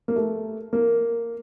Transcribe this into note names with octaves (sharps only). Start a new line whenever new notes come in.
A#3
A3
A#3